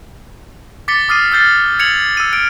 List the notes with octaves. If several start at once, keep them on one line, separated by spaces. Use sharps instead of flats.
D6 A6 B6 C#7 G7
D6 D#6 F6 A6 C7 D#7
E6 F6 G6 A6 C7
G#6 C#7 F7 F#7
E6 D#7
F6 D7